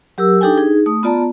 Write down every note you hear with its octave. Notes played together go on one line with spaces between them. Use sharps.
F#3 G4 A#4 E6
D4 D#4 G4 A4 G5 G#5
D#4 G#4
A3 D#6
B3 F4 D5 A5 A#5